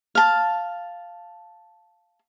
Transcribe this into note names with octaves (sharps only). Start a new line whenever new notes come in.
F5 A5